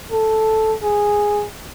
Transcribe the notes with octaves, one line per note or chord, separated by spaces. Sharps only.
A4
G#4